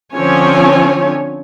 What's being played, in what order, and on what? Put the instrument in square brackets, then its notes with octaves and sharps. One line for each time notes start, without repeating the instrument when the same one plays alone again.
[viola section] D3 F3 C4 C#4 C#5 G#5